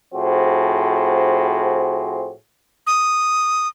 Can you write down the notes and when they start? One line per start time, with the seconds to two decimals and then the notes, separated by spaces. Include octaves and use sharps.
0.14 A2 F3 C4 F#4 G#4
2.87 D#6